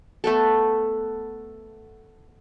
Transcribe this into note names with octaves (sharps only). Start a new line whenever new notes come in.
A3 B3 A4